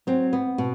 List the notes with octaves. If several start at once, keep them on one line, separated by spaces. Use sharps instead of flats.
F#3 C4
B3
B2